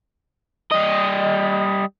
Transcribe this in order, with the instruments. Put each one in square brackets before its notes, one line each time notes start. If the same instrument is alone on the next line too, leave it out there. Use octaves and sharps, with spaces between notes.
[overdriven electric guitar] G3 D#5